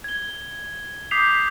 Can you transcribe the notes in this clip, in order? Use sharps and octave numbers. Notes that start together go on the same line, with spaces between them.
G#6 G7
D6 D#6 G6 B6 C7 F7